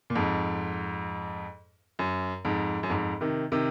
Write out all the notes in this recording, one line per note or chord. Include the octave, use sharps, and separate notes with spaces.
A#2
F2 G#2
F#2
F2 G#2
F#2
F2 G#2
C3 D#3
C3 D#3